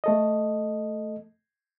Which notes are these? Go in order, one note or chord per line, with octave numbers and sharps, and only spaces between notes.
A3 A4 D#5